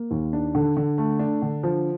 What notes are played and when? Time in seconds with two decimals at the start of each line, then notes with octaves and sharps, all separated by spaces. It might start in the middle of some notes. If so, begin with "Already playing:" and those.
Already playing: A#3
0.11 D#2
0.33 D4
0.55 D3
0.77 D3
0.98 A3
1.19 D4
1.42 D3
1.63 F3